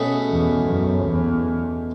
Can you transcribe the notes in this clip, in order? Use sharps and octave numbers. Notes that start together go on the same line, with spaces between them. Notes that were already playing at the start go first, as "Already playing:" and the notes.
Already playing: B2 A3 C#4 G#4 B4
E2
F#2
E2